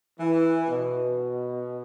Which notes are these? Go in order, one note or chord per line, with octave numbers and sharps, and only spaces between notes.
E3
B2